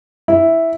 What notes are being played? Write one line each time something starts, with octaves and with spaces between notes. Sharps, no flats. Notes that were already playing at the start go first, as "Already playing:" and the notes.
E4